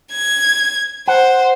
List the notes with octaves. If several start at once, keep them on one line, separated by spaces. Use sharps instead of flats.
G#6
C5 F#5